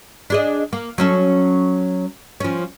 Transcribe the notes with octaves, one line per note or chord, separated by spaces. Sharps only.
D4 G#4 D#5
A#3
F#3 C#4 A4
F3 C#4